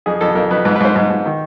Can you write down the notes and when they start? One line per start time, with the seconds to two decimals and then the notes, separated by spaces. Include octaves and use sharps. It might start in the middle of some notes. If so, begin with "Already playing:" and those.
0.06 F2 G#4
0.21 F2 A4
0.35 F2 A#4
0.51 F2 B4
0.65 G#2 B4
0.76 B4
0.80 G#2 C5
0.96 G#2
1.10 G#2
1.25 D#3